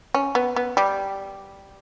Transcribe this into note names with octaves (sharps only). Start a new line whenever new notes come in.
C#4
B3
B3
G3